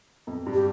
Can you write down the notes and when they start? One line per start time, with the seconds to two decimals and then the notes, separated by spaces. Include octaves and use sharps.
0.27 F2
0.46 G2
0.54 G4